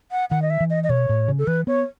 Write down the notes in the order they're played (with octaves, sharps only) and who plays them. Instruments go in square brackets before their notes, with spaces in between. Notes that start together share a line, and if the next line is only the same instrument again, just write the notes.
[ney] F#5
[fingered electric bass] D#3 [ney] F#5
[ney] D#5
E5
[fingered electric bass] E3
[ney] D#5
D#5
[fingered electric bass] B2 [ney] C#5
[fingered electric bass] A2
C#3
[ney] A4
[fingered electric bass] E3 [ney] B4
[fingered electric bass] B3 [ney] C#5